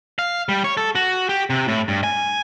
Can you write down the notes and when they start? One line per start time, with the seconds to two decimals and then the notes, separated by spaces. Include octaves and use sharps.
0.19 F5
0.49 G3
0.64 C#5
0.77 A4
0.95 F#4
1.29 G4
1.50 C3
1.68 A2
1.88 G2
2.04 G#5